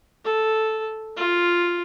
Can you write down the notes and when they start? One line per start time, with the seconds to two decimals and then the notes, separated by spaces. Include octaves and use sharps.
0.25 A4
1.17 F4